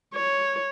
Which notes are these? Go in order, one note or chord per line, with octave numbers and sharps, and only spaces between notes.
C#5